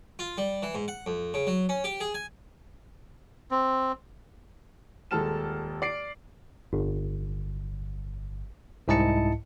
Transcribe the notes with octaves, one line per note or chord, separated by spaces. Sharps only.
F4
G3
E3
G#2
F#5
F2
C#3
F#3
C#4
G4
G#4
G#5
C4
D#1 G#3 A4 A5 F6 E7
D5 C7 D7
G1
C2 G#2 E4 D#5 A5 C#7